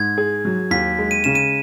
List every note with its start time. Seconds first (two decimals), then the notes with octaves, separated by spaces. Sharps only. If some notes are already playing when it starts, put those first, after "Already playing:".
Already playing: G#2 G#6
0.18 G#4
0.45 F#3
0.71 D#2 B6
0.98 G#3
1.11 D#7
1.24 C#3 E7
1.35 D#7